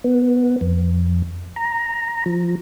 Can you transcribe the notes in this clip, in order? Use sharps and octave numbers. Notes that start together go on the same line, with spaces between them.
B3
F2
A#5
F3